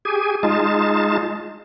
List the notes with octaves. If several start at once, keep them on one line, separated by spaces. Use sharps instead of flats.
G4 G#4 G#5
G#3 D#4 F4 A5